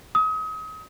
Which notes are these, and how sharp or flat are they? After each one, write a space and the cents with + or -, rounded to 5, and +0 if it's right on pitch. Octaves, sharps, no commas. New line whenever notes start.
D#6 +35